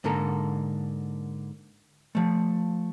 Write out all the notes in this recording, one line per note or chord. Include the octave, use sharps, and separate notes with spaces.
G#2 D3 A#3 A4 A#5
F3 A3